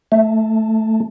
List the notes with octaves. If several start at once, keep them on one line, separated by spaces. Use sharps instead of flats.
A3